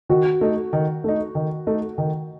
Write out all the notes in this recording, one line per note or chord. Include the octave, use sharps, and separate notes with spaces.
D#3 F#4
A3 D#4
D#3
A3 D#4
D#3
A3 D#4
D#3